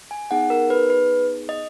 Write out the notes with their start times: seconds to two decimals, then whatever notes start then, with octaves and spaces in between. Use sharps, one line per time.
0.11 G#5
0.31 B3 D#4 G#4 F#5
0.50 A#4
0.70 B4
0.90 B4
1.49 D#5